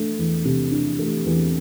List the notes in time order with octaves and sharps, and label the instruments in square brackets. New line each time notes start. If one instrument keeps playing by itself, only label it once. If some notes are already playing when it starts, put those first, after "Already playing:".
Already playing: [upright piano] A3 D4
E2
C3
D4
A3
E2